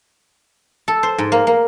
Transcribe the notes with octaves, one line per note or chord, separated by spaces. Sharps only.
A4
C5
G#2
A#3
A#3